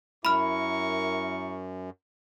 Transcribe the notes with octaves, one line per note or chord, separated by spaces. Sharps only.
F#2 E4 A#4 B5 C#6 F6